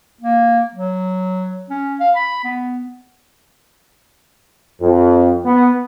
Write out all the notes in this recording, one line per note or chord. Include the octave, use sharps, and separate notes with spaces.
A#3
F#3
C#4
F5
B5
B3
F2
B3